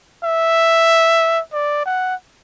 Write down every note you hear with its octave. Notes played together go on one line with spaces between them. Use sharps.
E5
D5
F#5